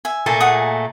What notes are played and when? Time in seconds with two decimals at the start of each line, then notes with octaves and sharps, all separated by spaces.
0.05 E5 G#5
0.26 A#2 A3 A#3
0.40 G#4 F#5 D#6